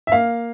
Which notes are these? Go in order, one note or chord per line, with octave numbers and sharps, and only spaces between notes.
E5
A#3 F5